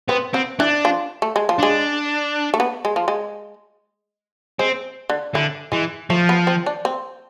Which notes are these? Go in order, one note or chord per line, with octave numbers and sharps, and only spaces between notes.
B3 C4
B3 C4
E3 D4
F3
A3
G#3
F3
G#3 D4
A3
B3
G#3
F3
G#3
G#3 C4
D3
D3 E3
E3 G#3
F3 A3
B3
C4
D4
C4